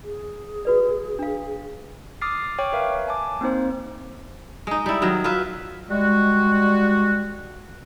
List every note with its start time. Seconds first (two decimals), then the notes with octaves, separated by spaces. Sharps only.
0.04 G#4
0.65 F#4 B4 D5
1.19 D4 F5
2.21 D6 D#6 F6 A6 C7
2.58 C#5 G5 C#6 D6
2.73 A#4 B4 C#5 E5 F5
3.08 G#5 A5 D6
3.41 A#3 C4 D#4 C5
4.67 G#3 D#4
4.86 G3 E4
5.02 D#3 F#3
5.24 F4 B4 E5
5.90 G3 G#3 F#4